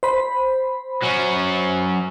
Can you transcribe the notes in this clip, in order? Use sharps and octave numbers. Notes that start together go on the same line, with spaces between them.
C5 B5
F#3 C#4